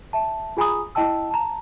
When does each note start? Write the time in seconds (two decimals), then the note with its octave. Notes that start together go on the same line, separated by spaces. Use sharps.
0.13 E5 A5
0.57 F4 G#4 G#5 A#5 B5 D#6
0.95 E4 D#5 G5 A5 E6
1.31 A5 A#5